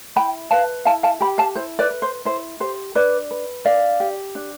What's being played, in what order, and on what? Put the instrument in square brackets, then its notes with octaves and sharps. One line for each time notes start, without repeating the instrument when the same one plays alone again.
[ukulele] E4 G5 B5
B4 F5 A5
E4 F5 A5
F5 A5
G4 G5 B5
F5 A5
E4 C5
B4 D5
B4
C5
E4 C5
G4 C5
D4 B4 D5
B4
D4 D5 F5
G4
D4